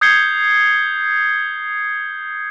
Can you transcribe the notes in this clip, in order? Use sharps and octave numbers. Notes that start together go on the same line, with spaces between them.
D#6 G6 G#6 C7 C#7 G7